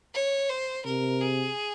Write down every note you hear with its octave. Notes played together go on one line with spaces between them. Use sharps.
C#5
C5
C3 A#4
G#4